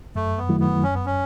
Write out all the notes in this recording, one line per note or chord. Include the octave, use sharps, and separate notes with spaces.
F#2 A3
B3
D#3 F#3 A3 E4
B3
F#2 C#4
B3
C#4